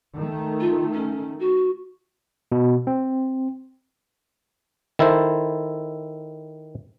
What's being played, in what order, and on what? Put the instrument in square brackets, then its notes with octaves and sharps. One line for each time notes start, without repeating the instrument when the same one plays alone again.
[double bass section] D#3 A3
[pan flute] F4
C#4
F#4
[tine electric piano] B2
C4
[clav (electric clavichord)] D#3 E4 A4 C5